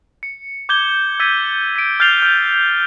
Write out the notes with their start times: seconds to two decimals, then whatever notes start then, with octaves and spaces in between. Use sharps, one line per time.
0.23 C#7
0.69 D6 G6 G#6 G7
1.20 E6 G#6 A6 B6 D#7
1.76 B6 D7
2.00 F6 G6 A6 C7 F7 G7
2.22 F6 D7 F7